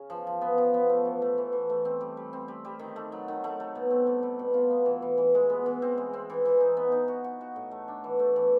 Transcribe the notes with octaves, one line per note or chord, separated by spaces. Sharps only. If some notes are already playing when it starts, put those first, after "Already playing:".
Already playing: C#3 C#4
F3
F3
B3
F3
B3
A3
E3
A3
E3
E3
A3
C4
G3
G3
C4
G3
G3
D#3
A3
F#3
D#3
A3
A3
B2
C4
G3
G3
B2
F4
B3
E3
E3
E3
G#3
B3
E3
C4
G#3
C4
E3
E3
D#4
B3
D#4
F#4
F#4
F#4
A2
A3
D4
E3
A3
E3